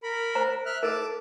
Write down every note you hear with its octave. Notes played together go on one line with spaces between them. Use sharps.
A#4 B5
C5 A#5
E5 F6 F#6
A4 A#4 A5 D6